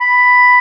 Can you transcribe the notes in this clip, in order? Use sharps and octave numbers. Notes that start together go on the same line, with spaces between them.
B5